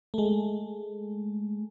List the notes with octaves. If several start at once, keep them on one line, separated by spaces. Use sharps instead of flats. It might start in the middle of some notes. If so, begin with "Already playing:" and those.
G#3 A3